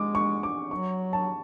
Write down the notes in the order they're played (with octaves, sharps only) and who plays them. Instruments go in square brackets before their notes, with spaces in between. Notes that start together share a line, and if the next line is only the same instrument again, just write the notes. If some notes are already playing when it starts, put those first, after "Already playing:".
Already playing: [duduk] G#3 [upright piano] D6
[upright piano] C#6
D6
[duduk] F#3 [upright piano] C#6
[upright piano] A5